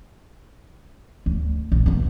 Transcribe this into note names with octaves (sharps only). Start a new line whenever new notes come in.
D2
A#1
D#2 B2